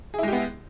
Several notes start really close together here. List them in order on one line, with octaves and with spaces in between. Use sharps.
G#4 E4 G#3 G4 B3